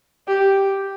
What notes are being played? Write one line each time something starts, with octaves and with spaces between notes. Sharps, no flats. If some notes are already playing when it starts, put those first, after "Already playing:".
G4